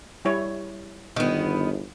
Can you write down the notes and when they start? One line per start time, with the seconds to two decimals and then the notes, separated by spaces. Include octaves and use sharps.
0.25 G3 E4 C#5
1.16 G1 E2 D#3 B3